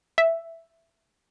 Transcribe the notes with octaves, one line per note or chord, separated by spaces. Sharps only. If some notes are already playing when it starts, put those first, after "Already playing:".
E5